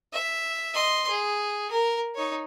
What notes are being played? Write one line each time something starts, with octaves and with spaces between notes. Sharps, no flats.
E5
D#5 C6
G#4
A#4
D#4 C#5